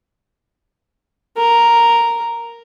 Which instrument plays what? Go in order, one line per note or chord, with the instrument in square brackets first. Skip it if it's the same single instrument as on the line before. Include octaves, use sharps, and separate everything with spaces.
[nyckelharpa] A#4